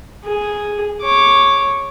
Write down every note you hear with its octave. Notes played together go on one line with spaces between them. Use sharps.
G#4
C#5 D6